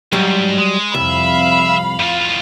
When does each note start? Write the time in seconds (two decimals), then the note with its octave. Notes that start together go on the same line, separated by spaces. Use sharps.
0.13 C#2 G#2 F#3 G3
0.58 G#3
0.94 C2 F2 E5 F5 B5
2.00 A2 F4